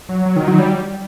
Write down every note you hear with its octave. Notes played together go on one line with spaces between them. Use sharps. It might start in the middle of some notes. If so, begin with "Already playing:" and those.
F#3
F#3
D#3
F#3
G3